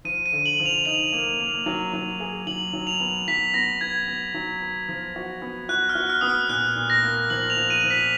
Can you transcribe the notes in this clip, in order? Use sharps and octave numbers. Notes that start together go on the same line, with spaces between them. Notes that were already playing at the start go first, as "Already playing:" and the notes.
F3 D#7
D#7
D3
F#7
F3
F7
D#4 F7
A#3
A#3
F#3
F#3
G#4
F#3 F#7
F#3
F7
B3
F#3 B6
B3 A#6
B3 G#6
B3
F#3
B3
F3
F#4
B3
F#4 F#6
F6
F#4
F6
B3 D#6
F6
A#2 F#6
A#2
A#6
A#3
F3 F#7
F7
F3
D#7
F3
B6